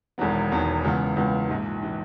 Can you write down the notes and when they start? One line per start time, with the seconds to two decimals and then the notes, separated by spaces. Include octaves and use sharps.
0.18 E1 E2 D#3 F#3 B3
0.51 E1 E2 D#3 F#3 B3
0.84 C#2 C#3 E3 B3
1.16 C#2 C#3 E3 B3
1.49 A#1 G#2 E3
1.83 E3